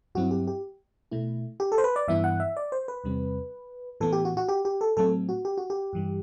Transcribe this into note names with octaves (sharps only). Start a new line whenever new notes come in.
G2 F#3 C4 E4 F#4
G4
G4
B2 A3 E4
G4
A4
C5
B4
D5
G2 E3 B3 E4 E5
F#5
E5
D5
C5
B4
E2 C3 G3 C4
A2 E3 B3 A4
G4
F#4
F#4
G4
G4
A4
A2 F#3 A3 C4 A4
F#4
G4
F#4
G4
G2 E3 G3